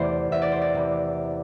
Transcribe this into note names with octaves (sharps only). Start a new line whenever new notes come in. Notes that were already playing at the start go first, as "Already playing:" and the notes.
Already playing: E2 C3 E3 A3 C5 D5
E2 E5
D5
C5
D5
C3 E3